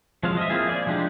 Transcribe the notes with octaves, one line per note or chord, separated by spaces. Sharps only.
F3 F#3 G#3 C4 F5
D#5 E5
A#3 C4 E4 F4 G#4
G#4 D5
F3 G#3 D4 D#4 G4